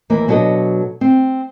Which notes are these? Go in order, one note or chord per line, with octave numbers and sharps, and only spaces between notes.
D#2 E3 A#3
B2 F#3 D4 G#4 A4 D#5
C4